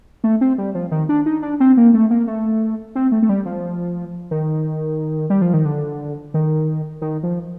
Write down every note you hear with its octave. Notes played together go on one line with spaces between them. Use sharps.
A3
C4
G3
F3
D#3
D4
D#4
D4
C4
A#3
A3
A#3
A3
C4
A3
A3
G3
F3
D#3
G3
F3
D#3
D3
D#3
D#3
F3